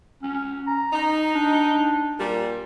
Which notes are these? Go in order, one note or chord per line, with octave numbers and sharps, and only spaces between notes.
C#4
A#5
D#4
D4
A#2 G3